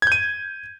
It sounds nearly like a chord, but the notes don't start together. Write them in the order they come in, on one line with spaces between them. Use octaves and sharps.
G#6 G6 D#7